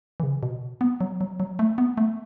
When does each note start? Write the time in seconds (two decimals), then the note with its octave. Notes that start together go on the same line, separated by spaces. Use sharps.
0.20 E3
0.23 C#3
0.43 B2
0.81 B3
1.01 F#3
1.21 F#3
1.40 F#3
1.59 A3
1.78 B3
1.98 A3